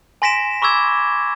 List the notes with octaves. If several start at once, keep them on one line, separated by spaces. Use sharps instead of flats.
G#5 C6 A#6 B6 D7 E7
B5 C#6 D6 E6 G#6 E7